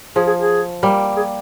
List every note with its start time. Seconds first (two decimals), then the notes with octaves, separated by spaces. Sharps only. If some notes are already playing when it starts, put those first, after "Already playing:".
0.16 F3 G#4
0.27 G#4
0.38 G#4
0.83 G3 A#3
1.17 G#4